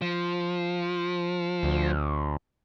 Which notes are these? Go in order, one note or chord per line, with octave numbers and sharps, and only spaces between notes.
F3
D2